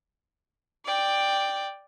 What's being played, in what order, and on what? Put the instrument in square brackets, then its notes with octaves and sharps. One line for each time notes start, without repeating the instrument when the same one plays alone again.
[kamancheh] D5 G5